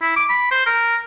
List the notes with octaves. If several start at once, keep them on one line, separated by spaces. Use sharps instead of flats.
E4
D6
B5
C5
A#4